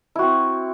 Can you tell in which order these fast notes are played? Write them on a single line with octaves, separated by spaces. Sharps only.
E4 F#4 C4